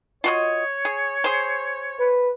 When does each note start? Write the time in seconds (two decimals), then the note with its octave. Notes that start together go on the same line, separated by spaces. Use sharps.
0.24 F4 F#4 C#5 D#5
0.85 G#4
1.24 G#4 C5
1.99 B4